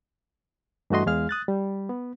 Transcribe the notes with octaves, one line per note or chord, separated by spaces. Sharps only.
G2 E3 A3 F#4 D#5 C6
E2 G#3 G#4 F5 F6
D#6 F#6 A6
G3
B3